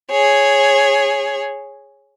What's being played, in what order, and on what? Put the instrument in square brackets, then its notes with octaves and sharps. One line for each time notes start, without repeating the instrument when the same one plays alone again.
[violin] G#4 C#5